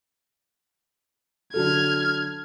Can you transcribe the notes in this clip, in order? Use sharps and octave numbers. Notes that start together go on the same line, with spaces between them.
D3 F#3 A4 F6 G#6